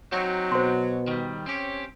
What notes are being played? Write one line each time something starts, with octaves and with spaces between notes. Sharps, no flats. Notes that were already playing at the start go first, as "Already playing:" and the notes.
F#3 C4 D#4
B2 C5 C6
D#3 G3
C4 C#4 G4